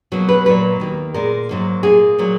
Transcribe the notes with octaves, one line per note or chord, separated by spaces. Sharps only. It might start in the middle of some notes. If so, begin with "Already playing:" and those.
B2 F#3 A#3
B4
A#2 F#3 A#3 B4
D#2 D#3 A#3
A#2 G#3 A#4
G#2 F#3 A#3
A#2 A#3 G#4
A#2 F#3 A#3